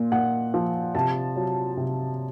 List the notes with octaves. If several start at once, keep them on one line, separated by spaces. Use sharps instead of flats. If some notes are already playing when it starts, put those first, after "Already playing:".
Already playing: A#2
A#2 F#5
F3
C3 A5
F#3
C3